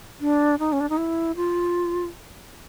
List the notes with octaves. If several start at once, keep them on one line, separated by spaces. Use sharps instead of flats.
D4
D#4
C#4
D4
D#4
E4
F4